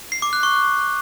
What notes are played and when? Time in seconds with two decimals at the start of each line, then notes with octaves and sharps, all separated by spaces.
0.12 C7
0.22 D6
0.33 F#6
0.43 C#6